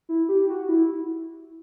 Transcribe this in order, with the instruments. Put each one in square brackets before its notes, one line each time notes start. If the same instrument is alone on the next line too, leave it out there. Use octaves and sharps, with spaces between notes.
[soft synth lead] E4
G4
F#4
E4